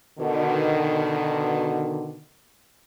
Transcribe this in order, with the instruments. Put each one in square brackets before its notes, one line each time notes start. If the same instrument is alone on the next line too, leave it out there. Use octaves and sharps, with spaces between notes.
[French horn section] B2 D3 D#3